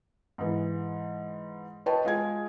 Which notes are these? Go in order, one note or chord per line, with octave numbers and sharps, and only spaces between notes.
G#2 E3
B4 C#5 D#5 G5 A5
G#3 F4 G#4 G#6